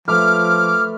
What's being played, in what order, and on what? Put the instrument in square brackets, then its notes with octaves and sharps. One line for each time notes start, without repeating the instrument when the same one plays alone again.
[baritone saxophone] F3 [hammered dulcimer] A3 B4 [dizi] D6 [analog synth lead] F6